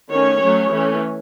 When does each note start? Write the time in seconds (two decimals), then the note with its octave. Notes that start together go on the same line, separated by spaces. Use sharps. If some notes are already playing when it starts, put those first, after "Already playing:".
0.12 D#3 A3 C#4 C#5
0.42 F#3 A3 C#4
0.71 E3 A3 C#4